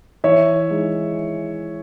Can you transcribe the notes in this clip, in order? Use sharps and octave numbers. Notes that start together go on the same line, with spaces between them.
E3 C#5 E5
G#3 D#4